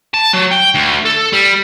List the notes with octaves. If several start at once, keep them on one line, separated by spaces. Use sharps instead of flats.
A5
F#3
G5
D2
A4
G3